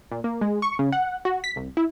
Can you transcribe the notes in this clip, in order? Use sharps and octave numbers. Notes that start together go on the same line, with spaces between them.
A#2
A#3
G#3
C#6
C#3
F#5
F#4
B6
C2
E4